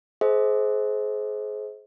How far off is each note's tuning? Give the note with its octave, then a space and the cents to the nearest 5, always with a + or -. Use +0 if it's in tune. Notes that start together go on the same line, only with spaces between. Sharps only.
G#4 +35 C5 +0 D#5 +45